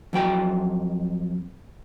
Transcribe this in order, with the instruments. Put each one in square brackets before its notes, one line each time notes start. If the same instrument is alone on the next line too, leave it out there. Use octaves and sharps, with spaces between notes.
[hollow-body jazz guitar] F2 F#3 G5 A#5